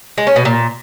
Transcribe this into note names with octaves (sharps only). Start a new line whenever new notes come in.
G#3
C#4
B2
A#2